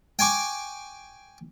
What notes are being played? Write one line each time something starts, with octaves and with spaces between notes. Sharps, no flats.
G5 G#5 C#6 D6